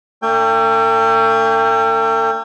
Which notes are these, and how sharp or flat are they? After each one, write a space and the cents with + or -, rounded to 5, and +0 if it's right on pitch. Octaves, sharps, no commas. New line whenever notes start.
A3 +45 D4 +0 G5 +25